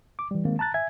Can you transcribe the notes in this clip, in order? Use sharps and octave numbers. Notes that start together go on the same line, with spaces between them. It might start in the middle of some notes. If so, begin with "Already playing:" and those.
D6
E3 G3
D#3 G#3 A#3 C4
A5 A#5 F#6 A6
E5 G#5 G#6